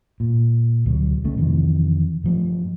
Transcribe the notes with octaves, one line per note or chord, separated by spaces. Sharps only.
A#2
D2 B2 F#3
C2 C#3 A3
F2 C3 D#3 E3
G2 F3 A3